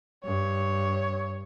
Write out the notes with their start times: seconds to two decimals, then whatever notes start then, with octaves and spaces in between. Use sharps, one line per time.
0.25 G2 C#5